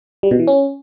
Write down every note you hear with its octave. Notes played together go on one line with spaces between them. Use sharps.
G3
B2
E3
C#4